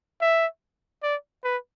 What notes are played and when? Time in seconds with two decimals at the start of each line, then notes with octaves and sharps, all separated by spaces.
0.21 E5
1.03 D5
1.44 B4